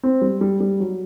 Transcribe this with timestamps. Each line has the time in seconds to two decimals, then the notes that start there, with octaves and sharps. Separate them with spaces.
0.03 C4
0.22 G3
0.41 G3
0.60 G3
0.80 F#3